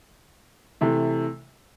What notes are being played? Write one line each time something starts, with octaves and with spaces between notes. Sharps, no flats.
C3 E3 A3